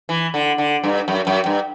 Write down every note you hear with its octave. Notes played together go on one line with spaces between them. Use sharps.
E3
D3
D3
G2
F#2
F#2
G2